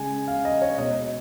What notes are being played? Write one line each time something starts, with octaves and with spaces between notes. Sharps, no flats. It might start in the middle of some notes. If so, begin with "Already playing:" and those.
Already playing: C#3 G#3 G#5
F5
D#5
C#5
B2 G#3 D#5